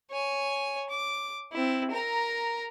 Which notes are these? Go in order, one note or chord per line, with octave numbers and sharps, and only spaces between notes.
C#5 G#5
D6
C4 E4
A#4 A#5